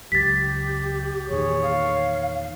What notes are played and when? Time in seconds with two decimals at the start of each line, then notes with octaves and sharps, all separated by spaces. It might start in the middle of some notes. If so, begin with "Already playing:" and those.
0.12 C#2 F#2 G4 A6 B6
1.30 E2 A#2 D#3 G#4 C#5
1.62 F5